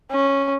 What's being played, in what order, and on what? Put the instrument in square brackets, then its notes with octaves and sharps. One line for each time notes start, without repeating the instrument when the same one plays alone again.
[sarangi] C#4